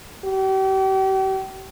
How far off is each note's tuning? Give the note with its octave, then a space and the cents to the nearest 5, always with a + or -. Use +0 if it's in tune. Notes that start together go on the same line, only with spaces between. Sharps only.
G4 -40